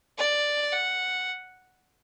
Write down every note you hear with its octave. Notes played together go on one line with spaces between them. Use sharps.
D5
F#5